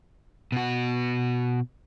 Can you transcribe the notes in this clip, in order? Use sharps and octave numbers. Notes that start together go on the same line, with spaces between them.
B2 F#4